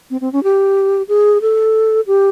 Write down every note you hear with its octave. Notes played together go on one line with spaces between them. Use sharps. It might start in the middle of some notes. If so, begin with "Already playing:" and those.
C4
C4
C#4
G4
G#4
A4
G4